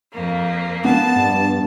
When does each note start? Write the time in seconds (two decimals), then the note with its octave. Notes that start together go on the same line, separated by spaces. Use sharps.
0.12 F2 A#3
0.84 B3 A5
1.16 G2